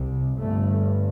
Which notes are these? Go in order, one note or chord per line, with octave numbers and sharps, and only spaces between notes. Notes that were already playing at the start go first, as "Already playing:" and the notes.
Already playing: C2 C3
G1 G2 A3